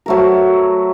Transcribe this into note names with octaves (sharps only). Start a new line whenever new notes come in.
F#3 A3 A#4